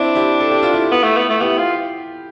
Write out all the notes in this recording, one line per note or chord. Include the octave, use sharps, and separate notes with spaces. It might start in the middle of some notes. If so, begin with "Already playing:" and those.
Already playing: C4 D4 E4
E4 G4
A4
G4
F4
E4 G4
B3
A3
B3
A3
B3 E4 G4
F4